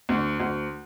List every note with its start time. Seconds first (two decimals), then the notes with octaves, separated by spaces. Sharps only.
0.09 D2
0.40 D2